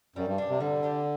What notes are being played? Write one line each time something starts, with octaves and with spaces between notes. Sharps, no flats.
F#2 G3
G2
D4 G4
C3
D3 G3
D4 G4